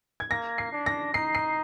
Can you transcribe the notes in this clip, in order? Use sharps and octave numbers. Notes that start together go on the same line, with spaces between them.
G#6
A#3 A#6
C7
D4
A#6
D#4 C7
C7